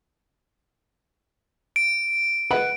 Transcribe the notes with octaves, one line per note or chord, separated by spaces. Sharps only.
D7
B4 F#5 B5